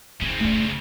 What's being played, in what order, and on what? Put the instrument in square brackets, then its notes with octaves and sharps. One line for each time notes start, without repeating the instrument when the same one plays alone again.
[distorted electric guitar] C#3 C4 [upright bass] E4
[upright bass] A3 D4